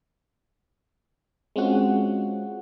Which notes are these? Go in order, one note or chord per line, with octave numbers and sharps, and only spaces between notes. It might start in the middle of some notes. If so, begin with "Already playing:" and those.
G#3 C4 C#4 F4 F#4 F#5